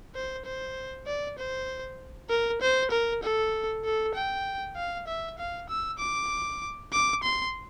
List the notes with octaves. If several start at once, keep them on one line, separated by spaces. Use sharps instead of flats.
C5
C5
D5
C5
A#4
C5
A#4
A4
A4
G5
F5
E5
F5
E6
D6
D6
C6